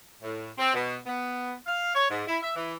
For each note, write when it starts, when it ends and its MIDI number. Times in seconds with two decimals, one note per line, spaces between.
0.22 0.50 45
0.58 0.73 60
0.74 0.97 47
1.07 1.53 59
1.66 1.92 77
1.95 2.06 73
2.10 2.23 44
2.28 2.37 64
2.43 2.53 76
2.56 2.74 52